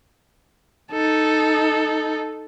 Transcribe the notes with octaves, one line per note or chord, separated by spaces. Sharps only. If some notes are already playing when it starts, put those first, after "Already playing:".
D#4 A4